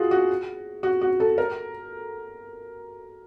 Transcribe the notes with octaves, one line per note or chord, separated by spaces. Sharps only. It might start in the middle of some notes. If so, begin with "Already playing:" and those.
Already playing: F4 F#4 G#4
F#4
F#4
F#4
A4
A#4